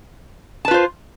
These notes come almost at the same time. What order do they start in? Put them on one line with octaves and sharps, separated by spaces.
A5 B4 F4 C5